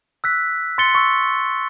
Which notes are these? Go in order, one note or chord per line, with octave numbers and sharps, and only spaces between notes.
E6 F#6 B6
C6 A6 C#7 G7
C#6 E6